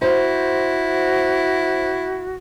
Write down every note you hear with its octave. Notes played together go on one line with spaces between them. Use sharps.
E4 F#4 C5